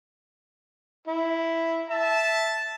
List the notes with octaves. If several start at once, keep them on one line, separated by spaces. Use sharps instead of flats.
E4
E5 A5